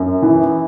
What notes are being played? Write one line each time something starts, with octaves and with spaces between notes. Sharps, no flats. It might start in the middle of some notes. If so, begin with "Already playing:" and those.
Already playing: F#2
E3